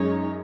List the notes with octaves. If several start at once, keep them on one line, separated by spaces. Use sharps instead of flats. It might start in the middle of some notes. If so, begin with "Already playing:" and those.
Already playing: F#2 G#3 D#4 C#5